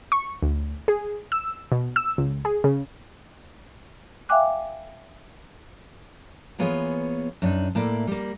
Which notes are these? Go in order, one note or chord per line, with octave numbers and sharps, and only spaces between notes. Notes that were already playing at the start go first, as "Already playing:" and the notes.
C#6
D2
G#4
E6
B2
E6
C#2
G#4
C#3
E5 F5 G5 G#5 D6 F#6
E3 A#3 B3 F4 G#4 C#5
F#2 D4 D#4
A2 A#3 E4 D5
G3 A#3